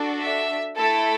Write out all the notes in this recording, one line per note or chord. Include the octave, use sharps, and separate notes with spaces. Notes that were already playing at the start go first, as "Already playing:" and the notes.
Already playing: D4 F#4 A4
E5
A3 E4 A4 A5